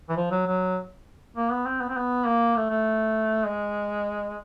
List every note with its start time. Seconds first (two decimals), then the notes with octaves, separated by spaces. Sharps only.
0.09 E3
0.17 F3
0.31 F#3
0.46 F#3
1.36 A#3
1.52 B3
1.66 C4
1.81 B3
1.89 C4
1.97 B3
2.25 A#3
2.56 A3
2.70 A3
3.45 G#3